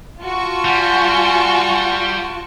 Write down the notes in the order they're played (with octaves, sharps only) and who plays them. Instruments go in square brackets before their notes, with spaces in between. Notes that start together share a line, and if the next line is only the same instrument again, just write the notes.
[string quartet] F4 A5 [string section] F#4 C#6
[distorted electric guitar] G3 [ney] G#5